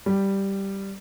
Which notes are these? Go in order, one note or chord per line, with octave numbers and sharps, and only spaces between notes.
G3